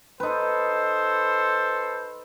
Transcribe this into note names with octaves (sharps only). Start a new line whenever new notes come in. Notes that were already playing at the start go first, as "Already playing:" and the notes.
D#4 A4 B4 C5